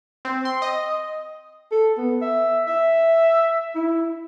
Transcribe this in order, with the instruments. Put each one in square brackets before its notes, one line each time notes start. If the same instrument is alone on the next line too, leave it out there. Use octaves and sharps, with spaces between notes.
[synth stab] C4
C6
D#5
[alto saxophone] A4
B3
E5
E5
E4